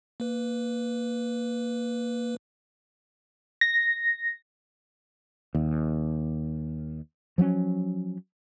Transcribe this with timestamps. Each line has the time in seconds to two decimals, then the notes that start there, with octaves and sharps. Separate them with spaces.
0.20 A#3 B4
3.61 A#6
5.55 D#2
7.38 F3 F#3 A3 C#4